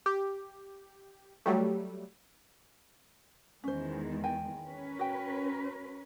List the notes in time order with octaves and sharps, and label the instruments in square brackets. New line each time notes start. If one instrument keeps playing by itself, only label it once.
[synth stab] G4
F#3 G3 A3
[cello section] E2 D#3 G#3 [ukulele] C#4 C5
[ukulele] G5 G#5
[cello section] C#4 A#4 B4
[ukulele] F#4 G5